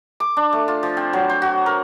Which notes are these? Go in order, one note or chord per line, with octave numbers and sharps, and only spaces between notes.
D6
D4
A3
F4
F3
C4
F#3
C5
F#4
A#4